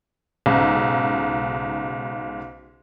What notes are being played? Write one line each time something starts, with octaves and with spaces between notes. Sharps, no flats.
B1 G#2 C#3